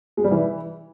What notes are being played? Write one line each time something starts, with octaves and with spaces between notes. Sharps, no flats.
G#3
G3
E3